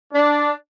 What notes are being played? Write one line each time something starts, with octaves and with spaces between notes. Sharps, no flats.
D4